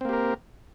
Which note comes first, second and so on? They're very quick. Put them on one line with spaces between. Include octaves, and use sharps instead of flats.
C4 A#3 G4 A#4